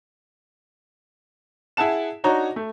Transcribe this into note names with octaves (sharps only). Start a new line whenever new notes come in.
E4 G#4 F#5 A5 E7
D4 D#4 F#4 C#5 A#5
A3